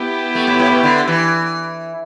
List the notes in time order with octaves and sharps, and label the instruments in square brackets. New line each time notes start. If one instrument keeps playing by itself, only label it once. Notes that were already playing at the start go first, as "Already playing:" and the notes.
Already playing: [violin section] B3 E4 G4 B4
[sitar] A3
A2
A2
B2
D3
E3